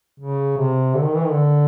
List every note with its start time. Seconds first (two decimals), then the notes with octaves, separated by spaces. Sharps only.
0.20 C#3
0.57 C3
0.95 D3
1.04 D#3
1.14 E3
1.24 D#3
1.32 D3